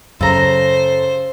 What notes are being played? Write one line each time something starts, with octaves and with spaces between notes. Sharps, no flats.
F#2 C#3 A4 C5 A#5